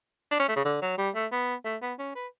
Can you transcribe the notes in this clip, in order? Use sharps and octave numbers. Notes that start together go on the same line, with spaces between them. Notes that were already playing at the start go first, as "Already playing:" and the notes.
D4
C#4
A3
C#3
D3
F#3
G3
A3
B3
A3
B3
C#4
B4